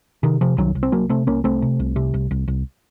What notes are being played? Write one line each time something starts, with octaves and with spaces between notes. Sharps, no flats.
C3 D#3
C3 F3
C2 D#3 F#3
C2
C4
C2 F#3 A#3
C3 A3 C4
C2 A#3 C#4
C2 A3 C4
C3
C2
C3
C2
C2
C2